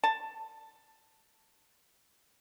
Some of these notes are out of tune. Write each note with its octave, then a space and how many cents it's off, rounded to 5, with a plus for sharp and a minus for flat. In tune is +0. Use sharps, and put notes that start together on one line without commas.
A5 +10